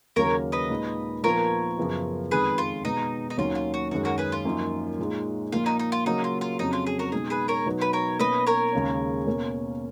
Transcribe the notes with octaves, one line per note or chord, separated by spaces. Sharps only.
D#2 C#3 F#3 A#3 C#4 A#4 C#5
B4 D#5
A#2 G#3 D#4
A#2 F3 B3 A#4 C#5
F#2 C#3 F3 B3
F2 D#3 G#3 G#4 B4
F4
B2 G#3 B3 D#4
D#4
D#2 D#3 F#3 C#4 F4
F4
F#4
F#2 D#3 G#3 C#4 F#4
F#4 A#4
G#4 B4
F4
F#2 F3 A#3 D#4
A#2 G#3 D#4
A#2 F3 A#3 F4
D#4
D#4
F4
C#3 F#3 A#3 D#4
F4
F4
F2 C#3 F#3 C#4 D#4
F4
G#4
F#4 A#4
B2 G#3 D#4 G#4
G#4 B4
A#4 C#5
B2 F#3 B3 D#4
B4
A#4 C#5
B2 A#3 C#4 B4 D#5
A#4 C#5
D#2 C#3 G#3 C#4
B2 A#3 C#4